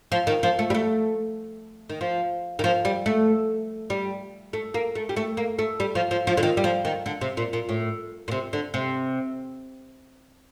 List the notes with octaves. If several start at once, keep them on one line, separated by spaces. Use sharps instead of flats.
F3
D#3
F3
A3
G3
A3
D#3
F3
D#3
F3
G3
A3
G3
A3
A#3
A3
G3
A3
A#3
A3
G3
F3
F3
F3
D3
D#3
G3
F3
D#3
D3
C3
A#2
A#2
A2
A#2
C3
D3
C3